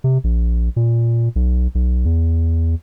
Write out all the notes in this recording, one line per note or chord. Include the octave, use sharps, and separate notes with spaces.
C3
A#1
A#2
B1
B1
E2